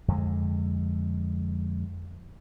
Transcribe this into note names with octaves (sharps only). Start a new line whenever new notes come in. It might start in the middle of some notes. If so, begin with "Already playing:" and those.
F2 D3 G#3